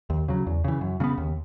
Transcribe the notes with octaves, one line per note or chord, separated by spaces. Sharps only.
D#2
C#3 F#3
E2
C#3 E3
F#2
C#3 G#3 B3
D#2